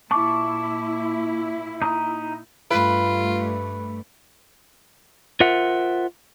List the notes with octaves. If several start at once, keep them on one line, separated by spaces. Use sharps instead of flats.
A#2 E4 A5 C#6 D6
D#4 A#5 D#6
G2 A3 F4 B4
F4 A#4 C5 E5 F#5